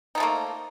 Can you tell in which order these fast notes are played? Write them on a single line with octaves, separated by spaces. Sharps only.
D#4 F3 A3 A#3